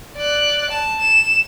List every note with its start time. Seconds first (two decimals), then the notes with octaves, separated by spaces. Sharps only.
0.17 D5 F#6
0.70 A5
1.01 E7